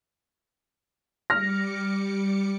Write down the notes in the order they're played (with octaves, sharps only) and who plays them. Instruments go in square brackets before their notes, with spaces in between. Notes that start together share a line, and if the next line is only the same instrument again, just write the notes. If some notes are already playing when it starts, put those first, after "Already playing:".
[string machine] G3 D6 C#7 [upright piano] F6 A#6